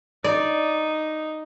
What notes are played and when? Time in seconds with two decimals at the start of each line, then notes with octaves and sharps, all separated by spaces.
0.24 D#4 D5